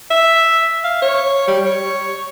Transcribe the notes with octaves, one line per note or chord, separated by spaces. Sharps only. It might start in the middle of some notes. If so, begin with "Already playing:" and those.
E5
F5
C#5
G3
C#5